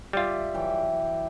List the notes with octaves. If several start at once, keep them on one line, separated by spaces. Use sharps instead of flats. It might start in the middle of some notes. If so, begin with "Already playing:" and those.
G3 F4 G4 D5 E5
E3 F#3 G5